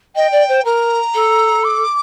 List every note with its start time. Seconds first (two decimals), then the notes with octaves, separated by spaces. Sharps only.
0.15 D#5 G5
0.31 D5
0.48 C5
0.64 A#4 A#5
1.14 A4
1.64 D6